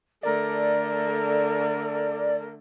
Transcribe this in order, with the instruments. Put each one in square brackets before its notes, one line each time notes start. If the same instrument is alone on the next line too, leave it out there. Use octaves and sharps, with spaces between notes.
[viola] D3 A3 [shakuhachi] A#4 [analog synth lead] D5